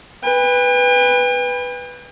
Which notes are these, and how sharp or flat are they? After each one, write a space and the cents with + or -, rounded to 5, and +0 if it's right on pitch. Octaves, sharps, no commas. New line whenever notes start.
B4 +0 G5 +45